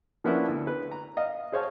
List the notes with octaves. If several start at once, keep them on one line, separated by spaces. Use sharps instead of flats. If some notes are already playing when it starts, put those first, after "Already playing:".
F3 A#3 B3 C#4 D4 E4
D2
B4
A#5
D#5 F5
G#4 C5 C#5 F5 A5